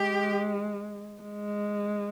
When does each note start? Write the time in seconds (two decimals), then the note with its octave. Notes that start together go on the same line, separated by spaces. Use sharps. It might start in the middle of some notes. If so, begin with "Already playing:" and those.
Already playing: G#3 G4
1.21 G#3